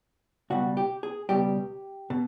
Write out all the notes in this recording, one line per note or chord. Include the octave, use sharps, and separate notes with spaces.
C#2 B2 G3 F#4
G4
G#4
C#2 B2 G3 G4
B2